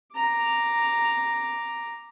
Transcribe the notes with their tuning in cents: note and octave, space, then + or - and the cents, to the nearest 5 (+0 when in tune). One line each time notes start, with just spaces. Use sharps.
A#5 +0 D6 +0